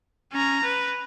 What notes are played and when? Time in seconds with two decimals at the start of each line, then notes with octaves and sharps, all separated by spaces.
0.32 C#4 A#5
0.64 B4